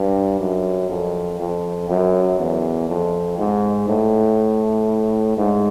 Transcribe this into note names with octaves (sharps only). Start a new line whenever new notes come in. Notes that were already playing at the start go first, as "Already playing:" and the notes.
Already playing: G2
F#2
F2
F2
F#2
E2
F2
G#2
A2
G#2